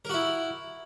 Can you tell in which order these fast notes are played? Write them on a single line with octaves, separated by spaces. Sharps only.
A#4 F#4 E4